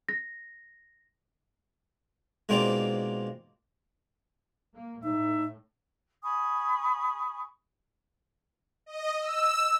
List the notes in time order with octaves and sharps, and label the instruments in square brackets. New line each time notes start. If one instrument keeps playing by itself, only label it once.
[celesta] A#6
[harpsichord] G#2 B2 A#3 C4 F4 D5
[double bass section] A#3
[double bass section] A2 [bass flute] D#4 [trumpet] E5
[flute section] G#5 B5 C#6 D#6
[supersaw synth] D#5
E6